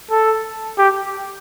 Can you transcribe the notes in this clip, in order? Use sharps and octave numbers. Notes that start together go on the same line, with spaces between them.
A4
G4